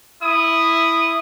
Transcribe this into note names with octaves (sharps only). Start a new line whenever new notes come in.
E4 D#6